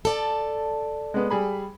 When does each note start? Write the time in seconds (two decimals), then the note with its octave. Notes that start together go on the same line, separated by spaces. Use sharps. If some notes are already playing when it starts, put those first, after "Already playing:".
0.05 A4 D5 A5
1.14 G#3 B3
1.31 G3 G#4 B5